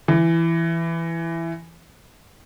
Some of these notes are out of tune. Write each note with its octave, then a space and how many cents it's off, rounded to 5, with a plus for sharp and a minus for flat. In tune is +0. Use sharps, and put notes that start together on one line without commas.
E3 +10